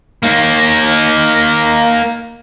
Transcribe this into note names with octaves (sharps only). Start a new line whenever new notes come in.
A#3 D#4